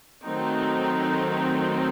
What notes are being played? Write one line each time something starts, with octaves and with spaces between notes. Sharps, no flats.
D#3 F#3 A3 C4 D#4